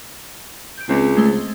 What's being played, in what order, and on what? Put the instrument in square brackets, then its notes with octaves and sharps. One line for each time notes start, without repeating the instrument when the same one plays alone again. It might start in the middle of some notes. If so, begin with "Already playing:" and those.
[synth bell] G6 D7
[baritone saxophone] C#2 [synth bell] C4
[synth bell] G#3 A3 C5